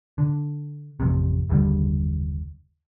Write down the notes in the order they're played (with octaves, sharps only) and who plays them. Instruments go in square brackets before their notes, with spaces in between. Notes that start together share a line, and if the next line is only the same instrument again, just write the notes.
[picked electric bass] D3
A1 F2 C3
F#1 D#2 D3 G3